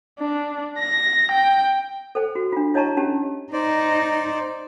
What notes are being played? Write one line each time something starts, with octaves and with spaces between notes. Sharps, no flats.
D4
A#6
G5
A4 C5 G5
F#4
D4 F4
E4 C#5 D#5 A5 A#5 C#6
C#4 G4 A5
D#4 C5 D5